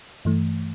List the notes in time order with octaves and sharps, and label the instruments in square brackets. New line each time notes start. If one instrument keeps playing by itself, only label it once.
[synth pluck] G2 E3 A3